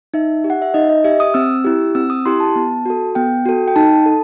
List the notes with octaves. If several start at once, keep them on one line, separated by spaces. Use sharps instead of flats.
D#4 E5
G4
F#5
E5
D#4 D#5
D#5
G4 E5
D#6
C4 E6
E4 G4
C4 E6
D#6
E4 G4 C6
A5
B3
F#4 A4
B3 G5
F#4 A4
G5
D#4 A5
A4